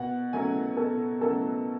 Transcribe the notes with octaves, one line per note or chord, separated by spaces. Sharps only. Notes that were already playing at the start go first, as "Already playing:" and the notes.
Already playing: B2 F#5
F#3 A3 C#4 G#5
B2 A4
F#3 A3 C#4 A4